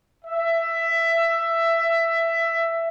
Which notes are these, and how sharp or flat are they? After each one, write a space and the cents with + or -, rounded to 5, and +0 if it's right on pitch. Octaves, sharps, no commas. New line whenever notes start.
E5 +15